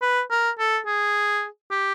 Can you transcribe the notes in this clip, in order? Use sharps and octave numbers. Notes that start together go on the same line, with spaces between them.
B4
A#4
A4
G#4
G4